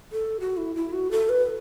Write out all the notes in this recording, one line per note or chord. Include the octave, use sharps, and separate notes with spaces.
A4
F#4
E4
E4
F#4
A4
B4